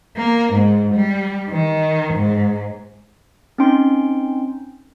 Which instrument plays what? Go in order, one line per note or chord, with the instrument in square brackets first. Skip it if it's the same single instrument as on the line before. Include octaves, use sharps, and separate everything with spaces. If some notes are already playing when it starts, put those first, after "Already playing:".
[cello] A#3
G#2
G3
D#3
G#2
[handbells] C4 C#4 D#4 G5 C6